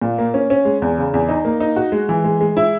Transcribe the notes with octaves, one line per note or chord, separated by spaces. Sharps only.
A#2
A#3
C#4
C#4
G#3
E2
C#3
E2
D#4
A#3
D#4
F#4
G#3
E3
G#3
G#3
E4